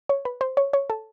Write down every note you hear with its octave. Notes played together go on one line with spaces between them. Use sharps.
C#5
B4
C5
C#5
C#5
A4